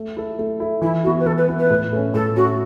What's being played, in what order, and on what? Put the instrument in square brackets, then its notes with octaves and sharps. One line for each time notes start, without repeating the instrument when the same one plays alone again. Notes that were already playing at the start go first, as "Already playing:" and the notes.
Already playing: [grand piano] A3
E4 A4
A3
E4 A4
[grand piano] E3 [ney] E4
[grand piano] B3 E4 [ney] F#4
[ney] B4
[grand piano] E3 [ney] A4
[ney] B4
[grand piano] B3 E4
[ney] B4
[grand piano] A2
A3 C#4
[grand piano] A2 [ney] A4
[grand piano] A3 C#4 [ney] F#4